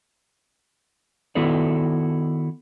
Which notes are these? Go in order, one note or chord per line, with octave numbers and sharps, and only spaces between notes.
D#3 B3 E4 F#4 A4 D5